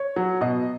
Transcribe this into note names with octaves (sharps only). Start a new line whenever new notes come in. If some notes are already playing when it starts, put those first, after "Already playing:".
Already playing: C#5
F#3
B2 D#5